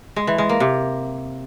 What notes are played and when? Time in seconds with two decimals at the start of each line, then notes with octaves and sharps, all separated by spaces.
0.16 G#3
0.27 E3
0.38 G#3
0.49 A#3
0.60 C3